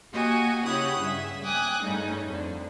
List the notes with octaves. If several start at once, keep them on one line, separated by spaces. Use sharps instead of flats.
A#3 F#4 G4 D#5 G#5
C#3 E4 G4 C#5 F#5 D#6
G2 C#3 G3 G#4 E5
G5 G#5 D6 D#6 F#6
G2 C#3 G3 A3 C#4 D#4
F2 D3